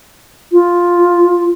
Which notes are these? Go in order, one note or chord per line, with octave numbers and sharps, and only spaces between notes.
F4